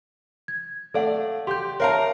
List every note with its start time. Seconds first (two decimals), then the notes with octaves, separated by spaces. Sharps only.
0.48 G#6
0.94 A3 A4 D5 F5 F#5
1.47 G4 C6 G6
1.80 A#4 C#5 E5 F5 A5 A#5